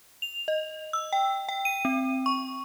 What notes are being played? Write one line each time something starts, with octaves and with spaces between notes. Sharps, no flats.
F7
D#5
E6
G5
G5
D#7
C4
C#6